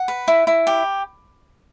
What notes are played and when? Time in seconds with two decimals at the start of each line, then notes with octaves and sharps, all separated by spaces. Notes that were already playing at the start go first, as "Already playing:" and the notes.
Already playing: F#5
0.08 B4
0.28 E4
0.47 E4
0.67 G4